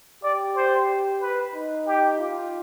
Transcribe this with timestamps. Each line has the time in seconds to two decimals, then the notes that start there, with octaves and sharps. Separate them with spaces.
0.23 G4 D5
0.55 C5
1.21 B4
1.54 D#4
1.87 G4
2.20 F4